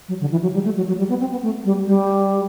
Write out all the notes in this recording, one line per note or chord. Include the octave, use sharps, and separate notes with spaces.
F#3
D3
E3
F#3
G3
A3
F#3
F#3
G3
B3
C4
B3
A3
G3
G3